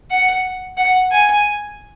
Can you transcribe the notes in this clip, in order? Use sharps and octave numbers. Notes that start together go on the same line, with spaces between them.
F#5
F#5
G#5